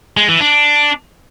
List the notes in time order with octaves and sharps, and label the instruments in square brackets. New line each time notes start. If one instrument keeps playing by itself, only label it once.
[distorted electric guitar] G#3
E3
D4